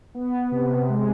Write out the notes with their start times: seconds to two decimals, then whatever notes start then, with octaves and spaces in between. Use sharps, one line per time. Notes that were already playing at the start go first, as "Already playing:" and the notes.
0.15 B3
0.52 C3
0.89 G#3